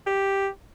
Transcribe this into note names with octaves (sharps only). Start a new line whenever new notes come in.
G4